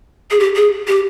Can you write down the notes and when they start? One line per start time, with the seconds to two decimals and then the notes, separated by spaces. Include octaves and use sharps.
0.31 G#4
0.40 G4
0.56 G#4
0.88 G4